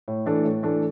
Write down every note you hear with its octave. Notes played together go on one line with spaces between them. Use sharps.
A2
E3 A3 D4 A4
A2
E3 A3 D4 A4